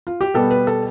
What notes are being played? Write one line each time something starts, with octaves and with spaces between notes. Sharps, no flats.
F4
G4
B2 G3 B3 A4
B4
A4